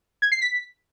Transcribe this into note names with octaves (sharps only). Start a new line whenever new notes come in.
G#6
C7
B6